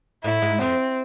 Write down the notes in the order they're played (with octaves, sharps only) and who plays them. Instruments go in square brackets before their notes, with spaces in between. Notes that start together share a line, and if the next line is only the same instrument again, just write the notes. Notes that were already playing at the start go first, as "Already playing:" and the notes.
[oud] A2 [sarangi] E4
[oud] G#2 G#3
[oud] F2 F3 [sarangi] C4